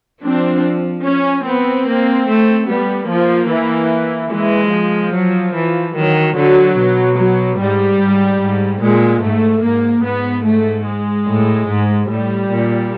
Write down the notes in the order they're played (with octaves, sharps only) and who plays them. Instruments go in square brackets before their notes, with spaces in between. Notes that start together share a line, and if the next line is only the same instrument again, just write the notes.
[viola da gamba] F3 [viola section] C4 D4
[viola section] C#4
[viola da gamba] B3 [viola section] C4
[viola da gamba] A#3
A3
[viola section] G3 [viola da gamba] B3
[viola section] F3 [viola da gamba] A#3
[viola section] E3
[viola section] E3 [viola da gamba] G#3
[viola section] F3
[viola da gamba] F#3
E3
[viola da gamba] D#3 [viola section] F#3
[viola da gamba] D3 [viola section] F#3
[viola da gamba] B2
[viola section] F#3
[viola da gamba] G#2 [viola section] G3
[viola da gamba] G#2
G#2
[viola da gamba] A#2 [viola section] G#3
[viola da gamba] G#2 [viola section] A3
[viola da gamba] G#2 [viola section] A#3
[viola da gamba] G#2 [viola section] B3
[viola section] A3
G#3
[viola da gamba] A2
G#2
[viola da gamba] A2 [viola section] G3
[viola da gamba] A#2